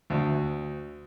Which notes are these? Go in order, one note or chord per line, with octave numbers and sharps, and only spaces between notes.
D2